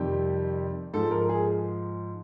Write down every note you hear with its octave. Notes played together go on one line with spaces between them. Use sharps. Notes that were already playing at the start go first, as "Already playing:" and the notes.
Already playing: F2 C3 D#3 G3 G4
G#2 F3 A4
A#4
G#4